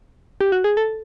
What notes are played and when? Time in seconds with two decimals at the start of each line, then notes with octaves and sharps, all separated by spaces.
0.41 G4
0.52 F#4
0.64 G#4
0.77 A4